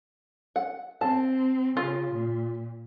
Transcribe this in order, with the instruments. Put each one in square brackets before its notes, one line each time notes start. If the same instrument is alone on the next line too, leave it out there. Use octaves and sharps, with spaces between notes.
[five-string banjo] F#5
[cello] C4 [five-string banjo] A5
[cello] C#3 [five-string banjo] F4
[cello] A#2